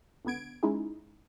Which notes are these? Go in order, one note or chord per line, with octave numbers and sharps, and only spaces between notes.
C#2 D3 B3 G#6 D7
G#3 C#4 D#4 E4 G#4